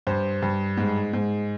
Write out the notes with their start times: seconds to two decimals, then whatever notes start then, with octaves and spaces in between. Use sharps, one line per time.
0.07 G2 C5
0.42 G2
0.77 G#2
1.13 G#2